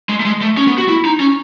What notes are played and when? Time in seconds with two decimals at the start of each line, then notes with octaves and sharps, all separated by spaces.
0.09 G#3
0.20 A3
0.25 G#3
0.42 A3
0.57 C#4
0.68 B3
0.78 F#4
0.89 E4
1.05 D#4
1.20 C#4